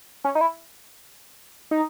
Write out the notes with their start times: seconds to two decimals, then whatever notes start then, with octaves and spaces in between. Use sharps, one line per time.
0.24 C#4
0.35 D#4
0.41 E4
1.71 D#4